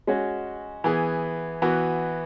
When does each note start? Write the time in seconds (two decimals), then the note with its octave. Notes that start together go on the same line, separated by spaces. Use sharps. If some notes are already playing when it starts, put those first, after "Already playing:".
0.07 G#3 C#4 F#4
0.84 E3 B3 G#4
1.62 E3 B3 F#4